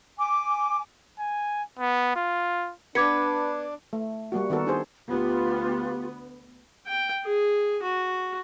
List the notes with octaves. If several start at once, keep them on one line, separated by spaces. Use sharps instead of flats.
G#5 D6
G#5
B3
F4
B3 D4 B4 D6 G#6 C#7
A3
G3 A#3 F#4
D#3 B3 F#4 A4 A#4
D4 D#4 G4 G#4 C5
D2 B3 F4 G4
G5
G#4
F#4